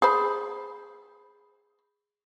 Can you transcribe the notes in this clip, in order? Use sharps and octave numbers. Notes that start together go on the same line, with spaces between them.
G#4 C5 B5